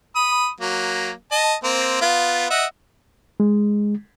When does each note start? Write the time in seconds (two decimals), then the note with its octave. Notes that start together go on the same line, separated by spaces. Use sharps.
0.16 B5 D#6
0.61 F#3 A#3
1.32 D#5 A5
1.64 A#3 C4 C5
2.01 B3 F4
2.51 D#5 E5 F#5
3.40 G#3